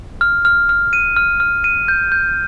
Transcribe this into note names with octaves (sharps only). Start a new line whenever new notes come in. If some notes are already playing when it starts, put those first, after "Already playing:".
F6
F6
F6
D#7
F6
F6
D#7
G6
G6